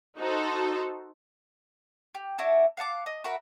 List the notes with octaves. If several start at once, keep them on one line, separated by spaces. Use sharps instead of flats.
D#4 F#4 A4 C5
G4
D4 E4 F#4 A5
F5 F#5 A5 D6
D#5
F#4 A#4 E5 B5